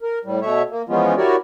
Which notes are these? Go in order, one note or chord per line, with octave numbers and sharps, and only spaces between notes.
A#4
A2 G3
B2 A3 C#5 E5
A#3
E3 F3 G#3 B3 C#4 F4
E4 F#4 G4 A#4 C#5 D5